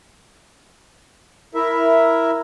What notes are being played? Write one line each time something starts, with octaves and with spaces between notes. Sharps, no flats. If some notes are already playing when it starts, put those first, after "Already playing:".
E4 A#4 E5